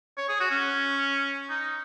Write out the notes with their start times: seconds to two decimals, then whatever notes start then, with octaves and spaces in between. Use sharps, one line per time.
0.17 C#5
0.29 G#4
0.40 F#4
0.51 C#4
1.50 D#4